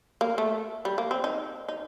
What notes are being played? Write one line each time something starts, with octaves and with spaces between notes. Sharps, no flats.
A#3
A3
G3
A#3
C4
D#4
D#4